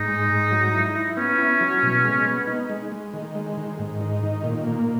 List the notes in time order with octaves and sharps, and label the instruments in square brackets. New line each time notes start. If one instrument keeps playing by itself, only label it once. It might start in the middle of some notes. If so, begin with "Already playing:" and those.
Already playing: [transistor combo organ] G#2 [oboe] D#4
[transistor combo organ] G#3
G#2
F#3
E4
E4
[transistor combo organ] B3 [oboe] C#4
[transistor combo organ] E4
F#3
B2
G#3
B3
D#4
G#3
G#3
D#3
G#3
D#3
G#2
D#4
D#3
A#2
A#3